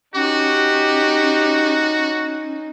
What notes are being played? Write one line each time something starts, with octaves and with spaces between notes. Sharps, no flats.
C#4 D#4 F#4 G4